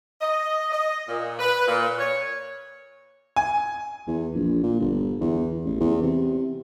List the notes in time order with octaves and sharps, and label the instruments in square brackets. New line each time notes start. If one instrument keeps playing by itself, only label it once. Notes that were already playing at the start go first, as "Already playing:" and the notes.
[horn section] D#5
D#5
A#2
B4
A#2
C#5
[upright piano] G#5
[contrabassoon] E2
A#1
A#2
G1
E2
A1
E2
C3